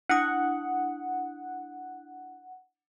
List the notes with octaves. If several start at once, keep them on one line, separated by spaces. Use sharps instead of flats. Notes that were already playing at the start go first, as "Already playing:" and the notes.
D4 E4 F#5 D#6